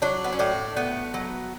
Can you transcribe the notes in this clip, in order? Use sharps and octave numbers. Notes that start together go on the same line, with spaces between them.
F#3 D4
B3
C#4
A2 D4
A3 B3
F#3